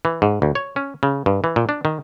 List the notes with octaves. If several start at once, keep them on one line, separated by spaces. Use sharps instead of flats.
E3
G#2
D2
C#5
C#4
C#3
G2
E3
A#2
D4
D#3